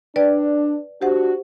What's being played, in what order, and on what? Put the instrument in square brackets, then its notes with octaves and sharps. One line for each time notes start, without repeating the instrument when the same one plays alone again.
[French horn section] D4 [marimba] B4 D5 G5
[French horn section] D4 F#4 [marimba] G4 C5 F#5